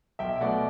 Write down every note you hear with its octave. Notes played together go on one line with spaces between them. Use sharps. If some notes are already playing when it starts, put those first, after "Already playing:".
B1 E5 G5
B2 F#3 A3 D5 F#5